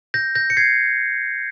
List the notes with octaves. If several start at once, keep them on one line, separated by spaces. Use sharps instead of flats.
G6 A#6
G6 A#6
C#7
G#6 C7